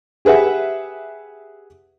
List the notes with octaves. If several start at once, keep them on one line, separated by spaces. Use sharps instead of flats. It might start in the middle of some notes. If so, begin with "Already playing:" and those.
G4 G#4 B4 E5 F#5